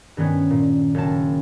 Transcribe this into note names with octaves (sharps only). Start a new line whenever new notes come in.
G2 D#3 B3 C#4
A#2
F#1 A5